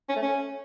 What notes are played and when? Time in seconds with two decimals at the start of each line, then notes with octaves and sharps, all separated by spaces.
0.09 C#4
0.16 A3
0.23 C#4